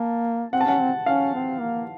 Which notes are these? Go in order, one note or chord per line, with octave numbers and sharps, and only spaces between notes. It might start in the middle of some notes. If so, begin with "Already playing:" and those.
Already playing: A#3 A5
C4 F#5
A5
C#4 F#5
C4
C#4 F5
C4
A#3